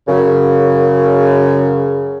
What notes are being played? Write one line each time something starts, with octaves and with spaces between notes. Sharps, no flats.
F#2 C#3